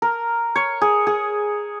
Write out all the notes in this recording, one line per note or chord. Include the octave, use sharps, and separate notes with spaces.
A#4
C#5
G#4
G#4